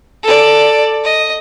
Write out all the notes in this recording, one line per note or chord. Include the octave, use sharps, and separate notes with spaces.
A4 D5
D#5